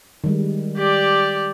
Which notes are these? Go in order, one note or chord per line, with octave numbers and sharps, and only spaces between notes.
D#3 G3 G#3
G4 D5